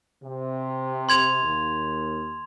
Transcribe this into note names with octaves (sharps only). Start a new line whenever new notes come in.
C3
C6 G#6 F7
D#2